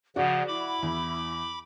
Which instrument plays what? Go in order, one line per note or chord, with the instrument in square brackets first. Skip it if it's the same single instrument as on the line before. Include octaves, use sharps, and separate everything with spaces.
[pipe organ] C#3 F3 [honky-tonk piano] F#4 D5 [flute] F#5
[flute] E4 [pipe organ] B5 D6
[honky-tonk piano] E2